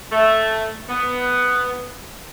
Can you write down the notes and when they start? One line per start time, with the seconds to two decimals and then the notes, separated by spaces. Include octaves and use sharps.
0.12 A3
0.89 B3